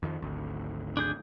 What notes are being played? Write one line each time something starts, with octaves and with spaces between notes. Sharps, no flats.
F2 D#3 F3
G#1 D2
D4 G#4 G6